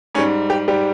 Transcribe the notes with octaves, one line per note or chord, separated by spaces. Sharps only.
G#2 G3 C#4
G4
G#2 G3 G4